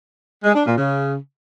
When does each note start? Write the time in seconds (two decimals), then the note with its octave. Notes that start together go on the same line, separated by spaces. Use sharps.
0.44 G#3
0.55 D4
0.67 A#2
0.78 C#3